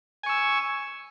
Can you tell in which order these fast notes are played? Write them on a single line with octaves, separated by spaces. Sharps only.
G#5 C#6 E6